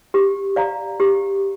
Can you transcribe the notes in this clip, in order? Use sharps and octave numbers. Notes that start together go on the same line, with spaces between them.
G4
D5 F5 A#5
G4